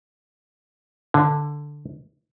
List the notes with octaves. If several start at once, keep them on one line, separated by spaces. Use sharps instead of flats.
D3